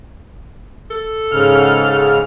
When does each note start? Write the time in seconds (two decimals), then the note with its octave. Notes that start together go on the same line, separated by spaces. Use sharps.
0.91 A4
1.32 G#2 C#3 F6